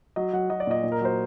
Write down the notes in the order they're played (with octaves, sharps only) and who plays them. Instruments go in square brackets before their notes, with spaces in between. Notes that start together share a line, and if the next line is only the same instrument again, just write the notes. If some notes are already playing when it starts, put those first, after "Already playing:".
[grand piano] F#3 D#5
F#3 F#5
F#3 D#5
D5
A#2 D#5
A#2
A#4
F#3 C5